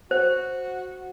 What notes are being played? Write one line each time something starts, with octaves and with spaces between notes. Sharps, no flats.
F#4 C5